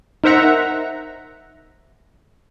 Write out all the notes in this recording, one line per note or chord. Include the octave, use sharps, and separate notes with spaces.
D#4 A#4 C5 E5 F#5 A#5